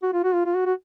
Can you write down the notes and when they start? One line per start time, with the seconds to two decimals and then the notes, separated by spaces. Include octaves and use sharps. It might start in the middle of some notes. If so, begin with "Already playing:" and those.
0.03 F#4
0.13 F4
0.24 F#4
0.34 F4
0.45 F4
0.55 F#4
0.66 F#4